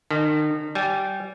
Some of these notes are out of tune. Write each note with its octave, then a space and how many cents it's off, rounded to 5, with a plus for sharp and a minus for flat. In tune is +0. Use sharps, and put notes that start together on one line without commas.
D#3 -35 A5 -45
G3 -20 G#5 +0